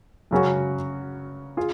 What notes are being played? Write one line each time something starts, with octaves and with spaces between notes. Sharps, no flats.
F#2 C#3 F#3 C#4 F#4
F4 G#4